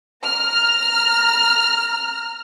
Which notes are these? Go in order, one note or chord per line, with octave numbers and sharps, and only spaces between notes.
A#5 F6